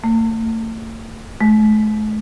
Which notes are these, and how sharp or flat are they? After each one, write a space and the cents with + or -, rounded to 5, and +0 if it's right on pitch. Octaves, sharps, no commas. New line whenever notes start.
A3 +40
A3 -45